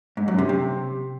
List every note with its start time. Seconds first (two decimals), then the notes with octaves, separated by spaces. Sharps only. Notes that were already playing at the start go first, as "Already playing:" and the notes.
0.17 G#2
0.28 F#2
0.38 C3
0.49 C3